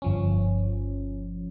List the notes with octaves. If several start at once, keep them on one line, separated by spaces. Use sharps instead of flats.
G1 F3 C#4